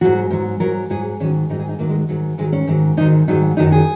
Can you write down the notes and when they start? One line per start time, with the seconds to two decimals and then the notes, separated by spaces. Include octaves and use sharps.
0.01 G#2 F#3 F#4
0.30 G#2 F#3
0.60 G#2 F#3 A#4
0.90 G#2 F#3 G#4
1.20 G#2 D#3 F#3 C#4
1.50 G#2 D#3 F#3 D#4
1.60 G#4
1.69 D#4
1.79 G#2 D#3 F#3 A#3
1.89 G#3
2.08 G#2 D#3 F#3
2.38 G#2 D#3 F#3 G#3
2.52 C#4
2.67 G#2 D#3 F#3
2.97 G#2 D#3 F#3 D#4
3.28 G#2 D#3 F#3 D#4
3.57 F#2 D#3 F#3 D#4
3.72 G#4